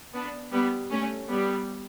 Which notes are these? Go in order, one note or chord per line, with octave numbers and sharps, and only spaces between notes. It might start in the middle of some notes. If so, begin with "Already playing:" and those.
B3 D4
G3 B3
A3 C#4
G3 B3